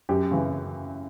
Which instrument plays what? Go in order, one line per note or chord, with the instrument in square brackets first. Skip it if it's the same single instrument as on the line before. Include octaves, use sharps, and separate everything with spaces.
[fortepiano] F#2 G4
C#3 E3